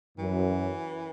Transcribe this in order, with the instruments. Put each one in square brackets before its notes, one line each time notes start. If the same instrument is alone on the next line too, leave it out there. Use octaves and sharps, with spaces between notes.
[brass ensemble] F#2 [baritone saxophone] E3